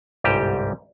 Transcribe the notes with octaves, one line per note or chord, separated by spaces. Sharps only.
G1 C2 G#2 G3 G4 G5